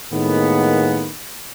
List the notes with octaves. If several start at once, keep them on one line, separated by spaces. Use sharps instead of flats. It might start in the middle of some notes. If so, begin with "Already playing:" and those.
A2 D#3 G#3 A#3 B3